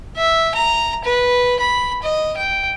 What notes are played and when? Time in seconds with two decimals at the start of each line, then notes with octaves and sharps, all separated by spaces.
0.17 E5
0.55 A#5
1.05 B4
1.60 B5
2.03 D#5
2.37 G5